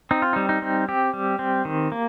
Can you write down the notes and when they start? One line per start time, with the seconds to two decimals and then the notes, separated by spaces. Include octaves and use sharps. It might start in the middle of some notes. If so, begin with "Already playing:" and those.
0.11 C4 D#4
0.22 F4
0.33 G3 D#4
0.49 D#4
0.62 C4
0.88 C4 G4
1.14 G3
1.39 C4
1.65 D#3
1.92 A#3